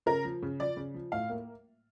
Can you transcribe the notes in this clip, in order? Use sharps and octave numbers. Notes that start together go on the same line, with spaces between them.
C#3 A#4
F3
C#3
F3 D5
C#3
F3
A2 F5
A#3